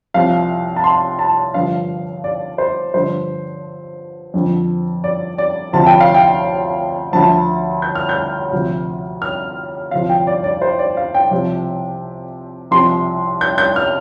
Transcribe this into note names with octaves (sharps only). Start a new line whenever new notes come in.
C2 C3 F3 F5
A5
C6
A5
G2 D3 F3 F5
D5
C5
G2 D3 F3 C5
F2 D3 F3
D5
D5
D2 C3 F3 A5
G5
F5
G5
D2 D3 F3 A5
G6
F6
G6
D2 C3 F3
F6
D2 C3 F3 F5
G5
D5
D5
C5
D5
F5
G5
C2 C3 F3
C2 C3 F3 C6
G6
G6
F6